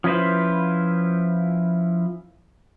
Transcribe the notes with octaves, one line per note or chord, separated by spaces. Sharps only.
F3 C#4 E4 B4 C5